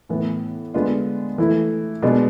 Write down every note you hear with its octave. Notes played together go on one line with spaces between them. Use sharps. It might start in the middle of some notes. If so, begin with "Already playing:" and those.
A2 E3 B3
D3 G#3 B3 D4 F4
E3 A3 E4
B2 G#3 B3 D4